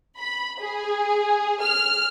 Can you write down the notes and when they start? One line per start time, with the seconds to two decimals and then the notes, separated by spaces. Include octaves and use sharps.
0.17 B5
0.60 G#4
1.62 F6